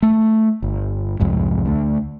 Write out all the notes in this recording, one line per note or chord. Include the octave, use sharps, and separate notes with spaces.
A3
G1
C2 F2 G#2
D2 A3